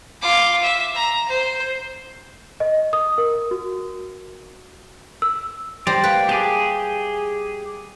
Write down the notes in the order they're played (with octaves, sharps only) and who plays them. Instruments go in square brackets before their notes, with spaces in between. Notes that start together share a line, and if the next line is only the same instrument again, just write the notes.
[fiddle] F4 D6
E5
A#5
C5
[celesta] D#5
D#6
A#4
F#4
E6
[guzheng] G3 C5 A#5 [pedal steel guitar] D5
[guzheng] A#3 B4
[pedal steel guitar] G4 G#4 [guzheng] A5